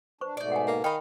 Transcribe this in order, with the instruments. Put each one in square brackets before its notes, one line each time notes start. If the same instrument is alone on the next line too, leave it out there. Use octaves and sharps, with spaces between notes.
[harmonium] D4 [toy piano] B4 C5 C#6
[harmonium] G#2 B2 A3 [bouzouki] D#4 D5
[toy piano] F#5 G#5
[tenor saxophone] A#3
[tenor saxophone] D#3 [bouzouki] D#5 F5 [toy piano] G5 B5